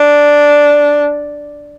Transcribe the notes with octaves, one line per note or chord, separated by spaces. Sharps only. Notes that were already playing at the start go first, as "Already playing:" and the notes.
Already playing: D4